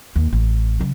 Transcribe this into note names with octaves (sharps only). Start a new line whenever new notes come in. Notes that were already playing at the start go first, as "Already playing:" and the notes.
D#2
A1
C#3 F#3